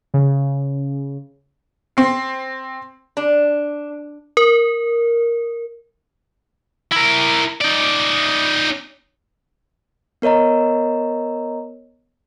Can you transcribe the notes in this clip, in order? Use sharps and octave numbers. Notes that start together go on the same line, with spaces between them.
C#3
C4 C7
D4
A#4
E4 A#4
D#4 D5
B3 A#4 C#5 D#5 A#5